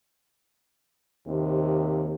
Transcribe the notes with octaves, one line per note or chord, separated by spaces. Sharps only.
D#2 C3